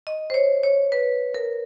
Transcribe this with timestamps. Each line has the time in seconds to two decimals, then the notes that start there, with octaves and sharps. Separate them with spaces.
0.07 D#5
0.30 C5
0.34 C#5
0.63 C#5
0.92 B4
1.34 A#4